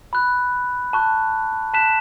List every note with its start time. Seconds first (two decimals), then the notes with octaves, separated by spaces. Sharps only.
0.13 B5 F#6
0.93 A5 C#6 F#6
1.74 A5 F#6 B6 E7